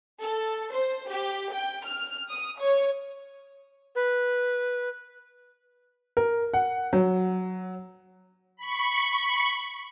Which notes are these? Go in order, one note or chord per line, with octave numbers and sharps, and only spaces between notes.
A4
C5
G4
G5
F6
D#6
C#5
B4
A#4
F#5
F#3
B5 C#6